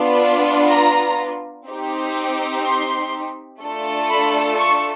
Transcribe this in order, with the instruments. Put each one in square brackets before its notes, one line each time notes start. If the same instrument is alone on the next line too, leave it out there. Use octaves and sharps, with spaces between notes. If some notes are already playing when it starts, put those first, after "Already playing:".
Already playing: [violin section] B3 D4 F4
A#5
C4 D#4 G4
C6
A3 D4 F4 A4
B5
C#6